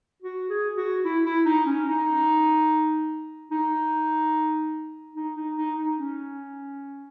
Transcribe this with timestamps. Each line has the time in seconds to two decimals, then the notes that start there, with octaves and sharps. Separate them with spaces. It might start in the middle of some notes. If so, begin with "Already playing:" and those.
0.22 F#4
0.50 G#4
0.77 F#4
1.05 E4
1.25 E4
1.46 D#4
1.66 C#4
1.87 D#4
3.51 D#4
5.16 D#4
5.36 D#4
5.57 D#4
5.77 D#4
5.98 C#4